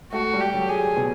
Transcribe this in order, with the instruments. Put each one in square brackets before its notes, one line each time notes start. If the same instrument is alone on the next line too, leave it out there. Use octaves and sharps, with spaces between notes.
[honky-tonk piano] A3 [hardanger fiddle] F#4
[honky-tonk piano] G3
[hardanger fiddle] G4
[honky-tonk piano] F#3
[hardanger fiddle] G#4
[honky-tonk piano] B2